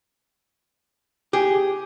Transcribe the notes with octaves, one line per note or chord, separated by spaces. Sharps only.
G4 G#4